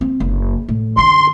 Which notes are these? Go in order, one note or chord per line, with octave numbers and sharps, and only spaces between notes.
C4
F#1
A2
F#2 D3 C6